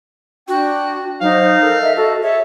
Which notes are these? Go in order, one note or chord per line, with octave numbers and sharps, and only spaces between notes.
D4 F#4 G5
F#3 D#4 C5 F5
A4 A#4
D#5 E5
F#4 A4
G#4 A4 C#5 E5